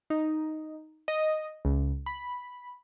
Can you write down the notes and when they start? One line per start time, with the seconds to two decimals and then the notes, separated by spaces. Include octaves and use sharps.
0.10 D#4
1.08 D#5
1.65 C#2
2.06 B5